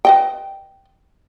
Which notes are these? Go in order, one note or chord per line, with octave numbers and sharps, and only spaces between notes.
B4 D#5 G5